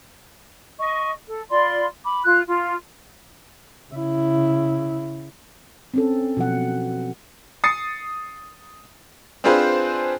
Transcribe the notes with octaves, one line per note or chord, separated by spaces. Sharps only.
D#5 C#6
A4
F4 D5 B5 C6
B5 D6
F4 F#6
F4
C#3 E4
C4 C#4 A4
B2 F3 F#3 F#5
D#6 A6 C7 C#7
C4 D4 F4 G#4 B4 C5